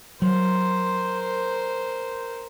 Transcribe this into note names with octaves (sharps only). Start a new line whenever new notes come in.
F#3 A#4 C5